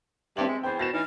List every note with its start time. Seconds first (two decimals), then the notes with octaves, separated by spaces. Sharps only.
0.37 G2 C4 E5 F#7
0.48 G#3
0.63 E2 C5 G5
0.79 B2 A6 A#6 E7
0.93 E3 D#4 F6